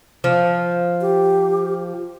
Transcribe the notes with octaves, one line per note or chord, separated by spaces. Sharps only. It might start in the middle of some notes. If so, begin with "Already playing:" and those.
F3
G4